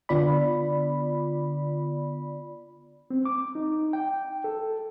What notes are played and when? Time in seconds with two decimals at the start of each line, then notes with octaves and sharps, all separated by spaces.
0.09 D3 B3 F4 D5 B5
3.10 C4
3.25 D6
3.55 D#4
3.93 G5
4.44 A4